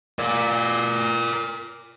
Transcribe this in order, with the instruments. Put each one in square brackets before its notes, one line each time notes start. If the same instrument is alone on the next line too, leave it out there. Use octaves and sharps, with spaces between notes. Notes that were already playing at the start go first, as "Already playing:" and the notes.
[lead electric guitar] A#4 D5